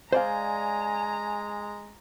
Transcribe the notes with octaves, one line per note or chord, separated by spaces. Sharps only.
G#3 C5 D5 F5 G#5 A#5